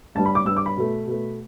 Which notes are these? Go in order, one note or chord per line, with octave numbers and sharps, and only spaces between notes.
G2 G3 A5
B5
D6
G2 G3 E6
D6
B5
B2 A3
B2 A3